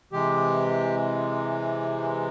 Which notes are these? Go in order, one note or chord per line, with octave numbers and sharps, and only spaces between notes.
C3 E3 G#3 G4